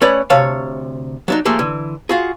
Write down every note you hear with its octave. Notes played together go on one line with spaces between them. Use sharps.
A3 C#4 B4 C#5 D5 B5
D2 C3 C#5 F5 A5
F#3 D4 D#4
F3 A3 A#3 G4 G#4
D3 E3
F4 F#4 G#4